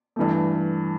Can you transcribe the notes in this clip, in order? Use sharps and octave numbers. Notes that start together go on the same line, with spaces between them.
G2 E3 A3